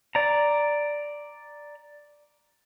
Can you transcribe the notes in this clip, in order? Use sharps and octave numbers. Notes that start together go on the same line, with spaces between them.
D5 A#5